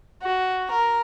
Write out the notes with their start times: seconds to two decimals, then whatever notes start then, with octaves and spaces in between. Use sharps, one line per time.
0.22 F#4
0.71 A#4